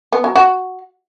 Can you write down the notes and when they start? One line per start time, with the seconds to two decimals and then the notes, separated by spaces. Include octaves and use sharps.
0.12 B3
0.24 F#3
0.35 F#4